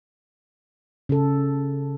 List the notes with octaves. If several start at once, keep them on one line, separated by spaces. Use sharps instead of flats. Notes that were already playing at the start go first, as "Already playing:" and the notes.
C#3 A4